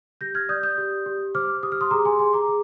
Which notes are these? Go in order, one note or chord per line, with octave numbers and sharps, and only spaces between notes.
G4 G6 A#6
F6 G#6
D5 D#6 G6
D#6 G6
G4
G4
C5 D6 F6
G4 D#6
F6
C6 D#6
G#4 A#5 D6
G#5 C6
G#4 G#5 C6
A#5 D6
G#4